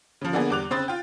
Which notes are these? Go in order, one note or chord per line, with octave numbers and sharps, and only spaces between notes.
C#3 F3
D3 A#3 B3 D4 G#4
E2 G3 D6 F#6 F7
C#3 C4 C5 B5 D#6 A6
F4 G5